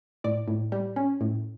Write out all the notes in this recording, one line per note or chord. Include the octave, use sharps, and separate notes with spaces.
A2 D5
A2
G3
C#4
A2